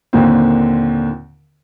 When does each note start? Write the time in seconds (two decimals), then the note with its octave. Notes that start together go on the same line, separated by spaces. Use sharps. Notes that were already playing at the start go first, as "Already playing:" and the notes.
0.13 D#2 A#2 D3 A#3 C4